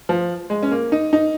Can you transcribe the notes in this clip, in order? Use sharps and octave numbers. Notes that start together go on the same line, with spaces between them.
F3
G#3
C#4
A#3
D#4
D#4